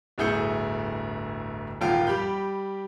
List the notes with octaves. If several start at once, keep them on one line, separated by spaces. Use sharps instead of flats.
D1 G1 E4 G#4 G6 C#7
D#1 G#1 F4 G5 F6
G3 G4 B5 G6